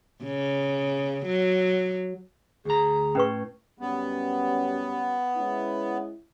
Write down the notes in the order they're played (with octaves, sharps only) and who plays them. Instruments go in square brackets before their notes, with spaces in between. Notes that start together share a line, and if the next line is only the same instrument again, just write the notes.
[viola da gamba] C#3
F#3
[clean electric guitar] D2 A#5 [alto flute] G#4
[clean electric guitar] A2 [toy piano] C#4 B4 C#6
[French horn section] F#2 G3 C#4 [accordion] B3
[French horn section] G#3 C#4 E4